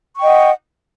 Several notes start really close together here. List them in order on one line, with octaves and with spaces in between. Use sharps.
C#6 G5 D#5 F#5